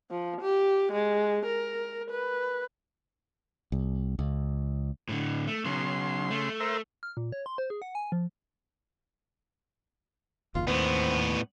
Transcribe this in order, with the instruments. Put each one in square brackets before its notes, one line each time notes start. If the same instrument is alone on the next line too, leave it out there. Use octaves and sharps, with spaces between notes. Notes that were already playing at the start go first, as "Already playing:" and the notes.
[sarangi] F3
G4
G#3
A#4
B4
[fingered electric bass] C2
C#2
[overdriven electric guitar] A2 D3
A3
[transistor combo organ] C#3 C6 [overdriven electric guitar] F#3 B3
[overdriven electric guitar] A3
[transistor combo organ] A#4 C5 E5
[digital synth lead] F6
A#2
C#5
C6
C5
G#4
F#5
G#5
F3
[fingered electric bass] F#1 D#2 [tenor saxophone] F4
[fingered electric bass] D#2 [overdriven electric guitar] A2 B3 [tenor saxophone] C4